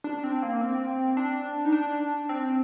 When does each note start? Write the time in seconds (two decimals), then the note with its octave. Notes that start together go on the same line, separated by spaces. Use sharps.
0.04 D4
0.24 C4
0.43 A#3
0.61 C4
1.17 D4
1.65 D#4
1.72 D4
2.29 C4